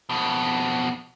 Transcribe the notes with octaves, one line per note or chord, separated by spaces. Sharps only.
F2 B2